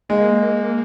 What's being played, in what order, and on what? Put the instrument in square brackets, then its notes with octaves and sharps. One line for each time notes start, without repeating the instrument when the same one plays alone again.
[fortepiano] G#3 [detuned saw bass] A#3